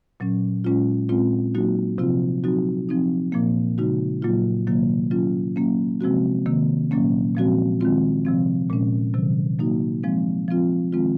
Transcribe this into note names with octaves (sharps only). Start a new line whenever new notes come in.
A#2 F#3 C#4
A#2 G#3 C#4 F4
A#2 G#3 C4 F4
F#3 A#3 D#4 F#4
C3 F3 C4 F4
F#3 C4 D#4 F#4
F3 C4 D#4
A#2 F3 A#3
C#3 G#3 D#4 F#4
A#2 F#3 A#3 F4
C3 D#3 F#3 A#3
F#3 C#4 F4
F#3 A#3 C#4
C3 F3 G#3 C4 F#4
C3 D#3 A#3
A#2 F#3 A#3 C#4
A#2 F3 G#3 C4 F#4
D#3 G#3 C4 F4
C3 F3 C4
A#2 G#3 C#4
C3 D#3 F#3
F#3 A#3 D#4 F#4
F3 G#3 C4
F3 C4 F4
D#3 G#3 C4 F4